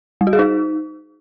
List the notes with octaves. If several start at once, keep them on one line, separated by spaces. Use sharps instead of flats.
G3
F#4
G#4
D#4